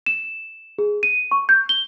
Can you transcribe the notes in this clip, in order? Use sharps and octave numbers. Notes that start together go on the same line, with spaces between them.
E7
G#4
D#7
C#6
G6
G7